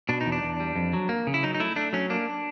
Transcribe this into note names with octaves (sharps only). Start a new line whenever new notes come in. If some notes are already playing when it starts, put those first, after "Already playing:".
B2 D4
D#4
E2
D4
E2
G3
F2
F#3
A#3
C#3
E4
F#3 D#4
D#4
A3 E4
A3 D4
F#3 C#4
A#3 D4